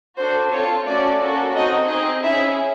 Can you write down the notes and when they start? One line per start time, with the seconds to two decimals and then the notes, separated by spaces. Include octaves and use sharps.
0.18 D4 F#4 A4 C5
0.52 C4 F4 A4 C#5
0.86 A3 C#4 F#4 A4 D5
1.21 A#3 C#4 F#4 A4
1.55 C4 D#4 F#4 D#5
1.88 C4 D#4 G#4 D#5
2.23 C#4 E4 G#4 E5